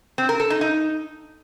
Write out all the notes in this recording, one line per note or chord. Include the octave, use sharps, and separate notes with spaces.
C4
A#4
A4
D#4
D#4